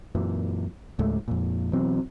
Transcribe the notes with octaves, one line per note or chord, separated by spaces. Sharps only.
F#2 A#2 E3
C#2 G#2 A3
F2 A#2
B2 E3 F#3 C4